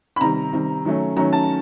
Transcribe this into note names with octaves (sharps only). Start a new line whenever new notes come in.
B5
C3 D#3 G3 A#5
C3 D#3 G3
D#3 F#3 A3 C#4
D#3 F#3 A3 C#4 A#5
A5